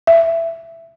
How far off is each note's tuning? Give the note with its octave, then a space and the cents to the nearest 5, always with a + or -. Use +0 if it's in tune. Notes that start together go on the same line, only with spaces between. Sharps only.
E5 +10